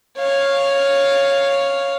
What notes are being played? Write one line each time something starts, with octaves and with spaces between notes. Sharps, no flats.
C#5 F5